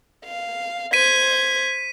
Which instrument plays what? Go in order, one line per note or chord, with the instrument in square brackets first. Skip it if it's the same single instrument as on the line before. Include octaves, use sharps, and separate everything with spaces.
[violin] F5
[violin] C5 G#6 [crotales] B6 D#7